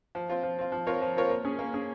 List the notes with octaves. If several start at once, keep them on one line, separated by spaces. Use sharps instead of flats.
F3
C4 F4
F3
C4 F4
F3
C4 F4 A#4 C#5
F3
C4 F4 A#4 C#5
A#3
C#4 G#4
A#3
C#4 G#4